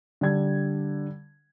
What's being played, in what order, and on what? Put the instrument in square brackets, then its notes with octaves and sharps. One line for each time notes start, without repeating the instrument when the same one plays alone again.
[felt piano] D3 G3 G#6